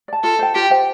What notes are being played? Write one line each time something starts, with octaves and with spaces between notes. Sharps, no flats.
D5 A5
F4 A4
C5 G5
F4 G4
C5 G5